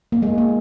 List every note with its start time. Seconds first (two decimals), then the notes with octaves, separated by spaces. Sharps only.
0.12 A#3
0.22 G#3
0.38 A#3